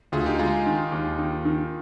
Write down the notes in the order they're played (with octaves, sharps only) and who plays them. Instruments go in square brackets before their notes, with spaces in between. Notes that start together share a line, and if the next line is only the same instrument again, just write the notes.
[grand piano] D2 [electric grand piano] F4 G#4
[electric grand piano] D#4 G4
[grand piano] G#3 [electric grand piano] F4 G#4
[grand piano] D#3
D#2
D#3
D#3